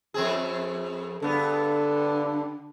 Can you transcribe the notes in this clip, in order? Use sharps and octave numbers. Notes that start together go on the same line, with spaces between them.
F2 C4 G#4
G2 D3 B3 A4